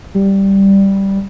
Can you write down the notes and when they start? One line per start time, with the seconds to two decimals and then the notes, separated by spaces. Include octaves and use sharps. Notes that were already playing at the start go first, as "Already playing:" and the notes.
0.15 G3